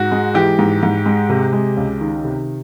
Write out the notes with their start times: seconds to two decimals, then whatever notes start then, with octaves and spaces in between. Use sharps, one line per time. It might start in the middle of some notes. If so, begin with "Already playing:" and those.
Already playing: G#2 F#4
0.12 G#3
0.34 E3 G4
0.59 G#2
0.83 G#2
1.06 G#3
1.29 C3
1.53 G#3
1.77 C#2
2.01 D#3
2.24 C3